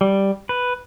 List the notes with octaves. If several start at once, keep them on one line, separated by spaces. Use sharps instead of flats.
G3
B4